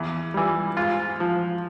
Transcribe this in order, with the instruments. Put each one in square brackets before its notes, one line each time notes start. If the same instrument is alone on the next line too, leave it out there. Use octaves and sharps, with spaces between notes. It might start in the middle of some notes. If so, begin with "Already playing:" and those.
Already playing: [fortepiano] E2
E3 G3
G#2 F4
F3